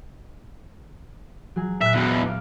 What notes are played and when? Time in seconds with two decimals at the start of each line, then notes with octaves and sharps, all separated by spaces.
1.56 F#3 G#4
1.82 A#2 E5 E6 F#6
1.95 E2 B2
2.26 D5 F5